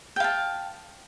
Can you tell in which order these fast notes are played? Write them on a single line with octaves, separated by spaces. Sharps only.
G5 F5 A5